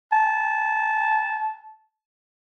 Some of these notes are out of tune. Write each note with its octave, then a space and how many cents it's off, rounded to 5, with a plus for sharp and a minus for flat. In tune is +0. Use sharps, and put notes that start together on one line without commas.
A5 -15